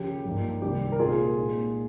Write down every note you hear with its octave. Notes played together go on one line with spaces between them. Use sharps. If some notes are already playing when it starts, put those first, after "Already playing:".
Already playing: D#2 C#3 F3 A#3 G4
G2 F3 A#3 D#4
C2 C3 D#3 G3 G4
A#4
C2 A#2 G#3 C4 F4 G#4
A#2 G#3 D#4